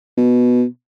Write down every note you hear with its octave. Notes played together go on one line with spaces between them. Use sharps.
B2